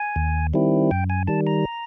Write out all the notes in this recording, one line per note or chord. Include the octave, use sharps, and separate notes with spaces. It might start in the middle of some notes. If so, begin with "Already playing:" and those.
Already playing: G#5
D#2
D#3 G3 C4 E4
F#2 G5
G#5
D#3 G3 A5
A#5